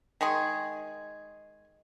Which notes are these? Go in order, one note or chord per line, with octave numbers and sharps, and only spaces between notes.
D#3 G#3 G#4